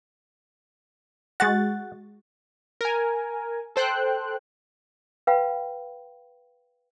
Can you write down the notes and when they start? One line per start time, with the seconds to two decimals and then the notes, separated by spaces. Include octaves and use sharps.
1.40 G#3 F#4 F#5 A6
2.81 A#4 G#5
3.76 A4 C5 G5 F#6
5.27 B4 F5 G5 B5